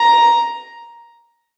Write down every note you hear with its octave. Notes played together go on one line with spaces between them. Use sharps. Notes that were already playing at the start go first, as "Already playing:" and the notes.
Already playing: A#5